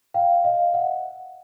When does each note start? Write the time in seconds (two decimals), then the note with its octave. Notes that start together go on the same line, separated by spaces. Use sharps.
0.14 F5 G5
0.44 D#5 F5
0.74 E5 F#5